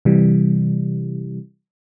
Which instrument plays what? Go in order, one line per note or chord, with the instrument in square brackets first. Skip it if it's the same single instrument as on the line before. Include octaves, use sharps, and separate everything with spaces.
[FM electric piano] C3 E3 G3